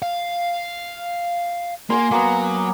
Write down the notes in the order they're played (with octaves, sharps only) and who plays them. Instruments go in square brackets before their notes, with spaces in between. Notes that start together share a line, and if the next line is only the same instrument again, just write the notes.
[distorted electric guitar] F5
[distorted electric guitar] A#3 [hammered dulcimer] F#5 G#5 C6
[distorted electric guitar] F#3 [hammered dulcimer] A#3 B3